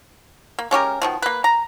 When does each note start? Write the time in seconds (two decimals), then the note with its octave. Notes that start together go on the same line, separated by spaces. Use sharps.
0.59 A#3
0.71 G#3 C#4 G4 A#4
1.02 B2 D#3 F3
1.22 A#3 B4
1.44 A#5